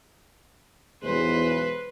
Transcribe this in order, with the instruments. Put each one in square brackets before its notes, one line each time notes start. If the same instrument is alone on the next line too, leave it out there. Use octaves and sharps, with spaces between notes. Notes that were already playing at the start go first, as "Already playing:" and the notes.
[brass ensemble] B1 E2 G#3 [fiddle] B4 C5